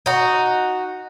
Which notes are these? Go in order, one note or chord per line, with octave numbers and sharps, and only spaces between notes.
D#4 F#4